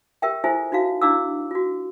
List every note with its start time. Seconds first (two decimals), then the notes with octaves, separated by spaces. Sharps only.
0.22 G4 A#4 E5 G5
0.44 E4 F4 A4 C5 E5 G#5
0.72 D#4 F4 F#4 F5
1.02 D4 E4 F5 D6 E6
1.51 F4 F#4